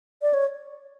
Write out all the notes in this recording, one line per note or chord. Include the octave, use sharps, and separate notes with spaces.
D5
C#5